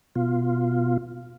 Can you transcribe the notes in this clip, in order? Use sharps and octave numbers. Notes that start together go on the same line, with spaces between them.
B2 F4